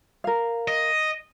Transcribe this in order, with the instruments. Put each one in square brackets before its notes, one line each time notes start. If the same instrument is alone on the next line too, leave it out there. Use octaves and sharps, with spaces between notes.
[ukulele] A#4 F5
[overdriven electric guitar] D#5